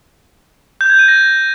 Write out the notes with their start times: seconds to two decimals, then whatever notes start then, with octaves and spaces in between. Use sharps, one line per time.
0.81 G6
0.90 G#6
0.99 D#7
1.08 A#6